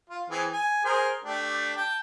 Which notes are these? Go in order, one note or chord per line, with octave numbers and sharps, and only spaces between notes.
F4
E3 C4 G#4
G#5
G#4 A#4 C5
A3 D4 G4
G5 A5